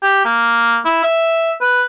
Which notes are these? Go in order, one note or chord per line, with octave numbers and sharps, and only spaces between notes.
G4
A#3
E4
E5
B4